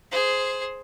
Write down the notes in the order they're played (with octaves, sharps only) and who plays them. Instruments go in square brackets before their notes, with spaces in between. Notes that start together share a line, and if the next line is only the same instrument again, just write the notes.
[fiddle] G#4 C5